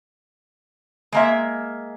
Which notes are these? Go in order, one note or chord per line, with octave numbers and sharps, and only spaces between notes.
G#3 A#3 E5